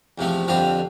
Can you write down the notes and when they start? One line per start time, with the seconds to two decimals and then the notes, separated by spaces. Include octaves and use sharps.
0.18 E2 C3 F3 A3
0.48 F2 D3 G3 C4 F4